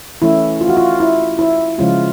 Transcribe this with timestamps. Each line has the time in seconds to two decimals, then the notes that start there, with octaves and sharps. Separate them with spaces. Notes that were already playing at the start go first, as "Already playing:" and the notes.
0.22 E3 A3 C#4 E4
0.61 F4
0.69 F#4
0.77 F4
1.00 E4
1.39 E4
1.79 C#3 F3 G#3 C#4 F4